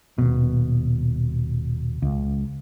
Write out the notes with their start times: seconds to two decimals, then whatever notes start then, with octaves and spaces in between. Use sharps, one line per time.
0.18 D#1 B2
2.02 C#2